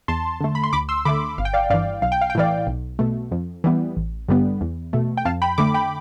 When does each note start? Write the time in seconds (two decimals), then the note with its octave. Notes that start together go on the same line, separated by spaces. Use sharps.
0.08 E2 A5 C6
0.40 D3 A3
0.55 B5
0.64 C6
0.73 D2 B5 D6
0.89 C6 E6
1.05 D3 A3 B5 D6
1.38 G1 F5
1.45 G5
1.53 D5 F5
1.70 G2 E3 D5 F5
2.02 B1 F5
2.12 G5
2.21 F5
2.30 G5
2.35 A2 E3 D5 F5
2.67 B1
2.99 B2 A3
3.32 F2
3.64 E3 G3 B3
3.96 A1
4.28 G2 D3 G3 B3
4.61 E2
4.93 B2 A3
5.17 G5
5.25 F2 F5 A5
5.42 G5 B5
5.58 D3 A3 B5 D6
5.74 G5 B5